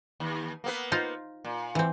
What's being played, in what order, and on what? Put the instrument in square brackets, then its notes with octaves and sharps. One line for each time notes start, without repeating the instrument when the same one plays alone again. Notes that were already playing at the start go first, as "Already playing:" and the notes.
[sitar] D#2
A#3 B3 B4
[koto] D#4 F4 C5
[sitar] A#2
[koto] E3 C4